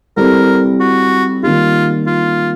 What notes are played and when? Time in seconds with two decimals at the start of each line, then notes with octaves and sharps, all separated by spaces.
0.17 G3 C4 E4 A4 A#4
0.80 F#4
1.43 D#3 G3 A#3 D#4 F4 G4
2.06 F4